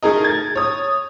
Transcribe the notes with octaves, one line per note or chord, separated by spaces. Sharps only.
A3 D#4 G#4 A#4 D#5
G#6 A6
C#5 D#6